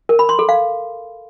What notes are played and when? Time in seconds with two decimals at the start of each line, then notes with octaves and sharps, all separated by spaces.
0.09 A#4
0.19 B5
0.29 C6
0.39 A4
0.49 F5